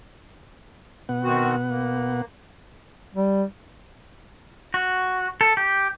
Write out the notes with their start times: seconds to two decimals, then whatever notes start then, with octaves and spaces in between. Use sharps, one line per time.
1.09 B2 B3 F#5
1.23 D#3 C4 F#4
1.69 A#3
3.15 G3
4.74 F#4
5.41 A4
5.57 G4